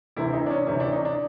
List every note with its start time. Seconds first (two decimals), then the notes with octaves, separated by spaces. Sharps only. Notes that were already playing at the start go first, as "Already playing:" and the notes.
0.16 D2 C3 E3 E4
0.33 D#4
0.46 D4
0.50 C#4
0.67 D2 C3 E3 C#4
0.80 D4
0.92 D#4
1.05 D4